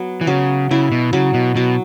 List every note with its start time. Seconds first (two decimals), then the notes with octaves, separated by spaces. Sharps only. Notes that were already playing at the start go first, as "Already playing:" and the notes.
Already playing: F#3 B3
0.21 E3
0.27 C#3 F#3
0.71 C#3 E4
0.92 B2
1.13 C#3 F#3
1.34 B2
1.55 B2 F#3